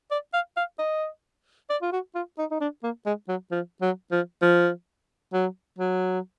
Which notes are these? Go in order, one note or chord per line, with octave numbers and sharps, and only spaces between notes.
D5
F5
F5
D#5
D5
F4
F#4
F4
D#4
D#4
D4
A#3
G#3
F#3
F3
F#3
F3
F3
F#3
F#3